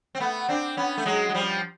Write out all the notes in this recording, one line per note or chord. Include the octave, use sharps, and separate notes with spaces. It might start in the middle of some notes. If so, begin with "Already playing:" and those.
C4
A3 B3
C4 D4
B3 C#4
A3
F#3 G#3
G#3
F3 G3